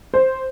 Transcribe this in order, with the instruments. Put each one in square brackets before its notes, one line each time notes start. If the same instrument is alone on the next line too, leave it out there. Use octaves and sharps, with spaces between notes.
[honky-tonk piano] C5